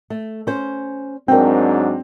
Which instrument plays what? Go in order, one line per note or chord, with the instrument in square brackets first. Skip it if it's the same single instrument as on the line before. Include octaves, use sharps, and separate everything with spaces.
[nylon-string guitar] A3
C#4 C5
[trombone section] G#2 F#3 D4 [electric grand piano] C4 [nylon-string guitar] A#4 G5